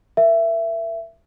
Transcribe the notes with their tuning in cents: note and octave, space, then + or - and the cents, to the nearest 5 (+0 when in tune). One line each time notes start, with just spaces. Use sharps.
A#4 +0 E5 +20